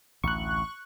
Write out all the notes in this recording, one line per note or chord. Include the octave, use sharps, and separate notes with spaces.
A1 D2 C#6 F#6